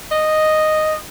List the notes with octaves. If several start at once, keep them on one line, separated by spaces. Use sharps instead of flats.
D#5